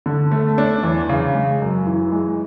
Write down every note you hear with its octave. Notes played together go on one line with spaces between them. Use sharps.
D3
A3
D4
E2
C#3
G#3
F#2
E3
G#3